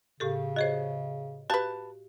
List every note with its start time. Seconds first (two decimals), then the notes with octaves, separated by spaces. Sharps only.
0.20 A2 C#3 G4 A4
0.56 F#4 G#4 C5 C#5 D#5
1.50 F#4 G4 B4 F5 A5